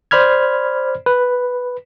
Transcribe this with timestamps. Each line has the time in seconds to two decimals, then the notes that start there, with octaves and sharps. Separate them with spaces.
0.11 C5 D5 B5 F6 G#6
1.06 B4